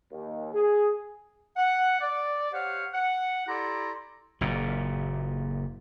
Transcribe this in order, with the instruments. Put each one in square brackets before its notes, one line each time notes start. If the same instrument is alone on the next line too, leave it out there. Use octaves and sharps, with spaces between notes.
[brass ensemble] D#2
G#4
[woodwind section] F#5
D5
G4 C5 C#5 F5 F#5
F#5
E4 G4 A4 D5 A#5 C6
[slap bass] F#1 A#2